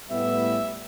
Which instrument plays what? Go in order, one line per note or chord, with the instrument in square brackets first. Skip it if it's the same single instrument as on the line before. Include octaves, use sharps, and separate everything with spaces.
[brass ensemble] A2 G3 B3 E5